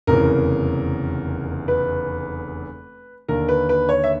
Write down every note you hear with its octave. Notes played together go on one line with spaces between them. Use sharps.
F1 E2 C#3 A#4
B4
D#2 D3 A#4
B4
B4
C#5
E5